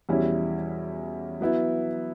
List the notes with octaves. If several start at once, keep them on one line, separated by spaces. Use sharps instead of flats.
E2 B2 G3 C#4 E4
F#3 B3 E4